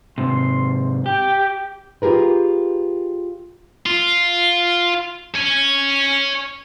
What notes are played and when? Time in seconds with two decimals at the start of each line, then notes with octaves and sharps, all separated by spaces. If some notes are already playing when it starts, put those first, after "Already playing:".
0.18 G#2 C3 C6
1.06 G4 G5
2.02 F4 G4 G#4 A#4 B4
3.86 F4
5.35 C#5 G#5